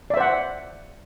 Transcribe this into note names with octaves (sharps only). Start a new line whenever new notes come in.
C5 D5 E5 F#5